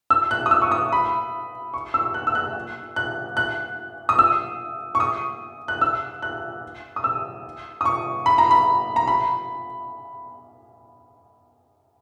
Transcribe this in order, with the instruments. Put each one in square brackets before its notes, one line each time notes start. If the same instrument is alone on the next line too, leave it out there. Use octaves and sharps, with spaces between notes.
[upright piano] E6
F#6
D#6
E6
C#6
D#6
B5
C#6
E6
F#6
E6
F#6
F#6
F#6
D#6
E6
C#6
D#6
F#6
E6
F#6
D#6
E6
D#6
C#6
B5
A#5
B5
A#5
B5